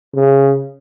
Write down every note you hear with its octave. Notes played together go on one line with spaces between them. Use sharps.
C#3